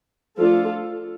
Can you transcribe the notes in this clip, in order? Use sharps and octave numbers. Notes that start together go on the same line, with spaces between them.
F3 A3 D4 F4 A4